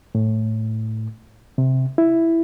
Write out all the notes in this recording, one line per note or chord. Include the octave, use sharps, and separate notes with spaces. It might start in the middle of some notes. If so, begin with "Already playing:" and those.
A2
C3
E4